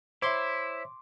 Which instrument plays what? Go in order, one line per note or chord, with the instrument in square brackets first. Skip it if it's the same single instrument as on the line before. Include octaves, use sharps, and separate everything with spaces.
[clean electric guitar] E4 [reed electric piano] C5 C#5 E5 [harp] C6 D6